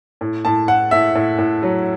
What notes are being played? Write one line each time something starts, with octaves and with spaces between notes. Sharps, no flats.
A2
A2 A5
A2 F#5
A2 E5
A2
A2
F#3